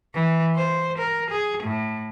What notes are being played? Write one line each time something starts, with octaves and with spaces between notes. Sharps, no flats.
E3
C5
A#4
G#4
A2